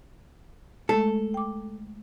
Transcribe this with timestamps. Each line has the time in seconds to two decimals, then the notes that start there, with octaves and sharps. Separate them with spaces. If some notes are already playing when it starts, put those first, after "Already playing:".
0.89 G#3 A3 A4
1.34 G5 D6